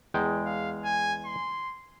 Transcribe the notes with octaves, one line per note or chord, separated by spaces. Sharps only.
E2 G#3 G5
F5
G#5
C6